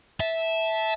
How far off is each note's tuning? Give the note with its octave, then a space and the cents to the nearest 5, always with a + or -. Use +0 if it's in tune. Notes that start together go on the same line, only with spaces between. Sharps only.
E5 -10 A5 -10